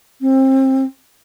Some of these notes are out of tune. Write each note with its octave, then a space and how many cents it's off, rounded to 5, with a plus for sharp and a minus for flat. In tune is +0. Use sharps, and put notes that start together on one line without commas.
C4 +25